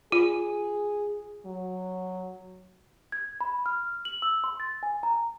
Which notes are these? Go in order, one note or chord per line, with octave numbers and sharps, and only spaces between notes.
F4 G#4
F#3
G#6
B5
F6
F#7
E6
C6
A6
G#5
A#5